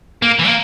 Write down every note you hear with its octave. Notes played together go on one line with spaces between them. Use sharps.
A#3
E3
A#3